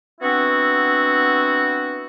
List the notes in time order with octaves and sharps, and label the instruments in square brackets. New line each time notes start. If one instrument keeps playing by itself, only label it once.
[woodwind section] B3 C4 D4 E4 F#4